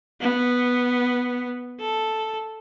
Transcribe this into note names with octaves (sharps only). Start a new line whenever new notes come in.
B3
A4